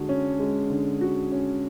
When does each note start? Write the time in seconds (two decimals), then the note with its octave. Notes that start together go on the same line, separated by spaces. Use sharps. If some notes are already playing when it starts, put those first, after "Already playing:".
Already playing: D3 G#3 F#4
0.09 C#4
0.39 G#3
0.70 D3
1.01 F#4
1.32 C#4